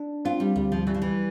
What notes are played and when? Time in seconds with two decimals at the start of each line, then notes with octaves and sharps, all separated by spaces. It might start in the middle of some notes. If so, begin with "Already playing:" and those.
Already playing: D4
0.25 C4 F4
0.40 G3
0.56 D2 G3
0.72 F3
0.87 E3 G3
0.95 F3
1.02 E3